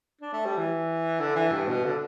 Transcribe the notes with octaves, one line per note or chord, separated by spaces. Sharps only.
D4
A3
G3
E3
D3
E3
G2
B2
D3